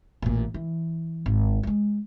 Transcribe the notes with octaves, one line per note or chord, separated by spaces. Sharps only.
A1 A#2
E3
G#1
G3 G#3